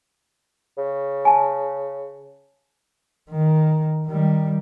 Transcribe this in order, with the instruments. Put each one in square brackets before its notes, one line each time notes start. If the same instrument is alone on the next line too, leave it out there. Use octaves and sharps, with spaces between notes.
[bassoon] C#3
[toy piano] G#5 A5
[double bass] D#3
D#3 G3